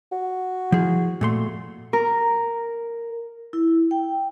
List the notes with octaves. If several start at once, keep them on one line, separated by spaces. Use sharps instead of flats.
F#4
F3 E4 G#4
A#2 A3 C6
A#4
E4
G5